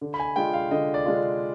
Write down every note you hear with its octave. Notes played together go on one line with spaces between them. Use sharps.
D3
B5
G#5
G#3 D4 F4 G5
F5
D3 D#5
D5
G#3 D4 F4